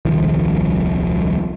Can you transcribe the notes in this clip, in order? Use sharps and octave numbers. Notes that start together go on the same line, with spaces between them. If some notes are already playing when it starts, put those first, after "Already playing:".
D#1 C2 D#3 F3